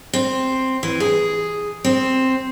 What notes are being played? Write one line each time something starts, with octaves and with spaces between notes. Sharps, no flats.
C4
E3
G#4
C4